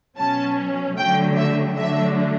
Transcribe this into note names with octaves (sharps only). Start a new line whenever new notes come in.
B2 F#3 C#4 A5
D3 F#3 A3 G5
E5
D3 F#3 A3 D4 E5